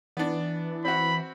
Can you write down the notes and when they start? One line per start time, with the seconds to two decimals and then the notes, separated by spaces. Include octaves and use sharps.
0.17 E3 B3 D4
0.85 C4 F#4 B5